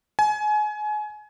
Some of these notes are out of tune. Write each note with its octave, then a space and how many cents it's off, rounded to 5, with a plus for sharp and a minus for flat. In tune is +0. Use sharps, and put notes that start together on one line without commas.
G#5 +30